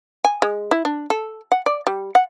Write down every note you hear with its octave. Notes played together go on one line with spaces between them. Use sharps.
G#5
G#3
E4
D4
A4
F#5
D5
G3
F#5